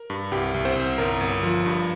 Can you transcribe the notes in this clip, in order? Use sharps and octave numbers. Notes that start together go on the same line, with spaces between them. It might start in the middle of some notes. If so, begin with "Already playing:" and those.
Already playing: A#4
G2
C2 G4
C2
C4 C5
C2
G1 A#4
G1
F3
G2